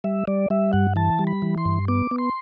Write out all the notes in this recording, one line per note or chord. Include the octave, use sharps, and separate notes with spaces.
G3 E5
G3 D5
G3 E5
G2 F#5
E3 A5
G3
B5
E3
C6
G2
B3 D6
B3
C6